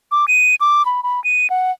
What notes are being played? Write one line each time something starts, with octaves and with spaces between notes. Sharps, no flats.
D6
D#7
D6
B5
B5
D#7
F#5